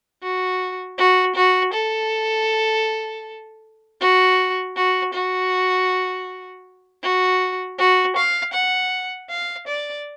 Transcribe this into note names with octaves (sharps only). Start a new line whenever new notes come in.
F#4
F#4
F#4
A4
F#4
F#4
F#4
F#4
F#4
F5
F#5
F5
D5